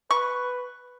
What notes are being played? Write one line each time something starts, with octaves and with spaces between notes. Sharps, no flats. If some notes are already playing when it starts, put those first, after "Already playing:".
B4 C#6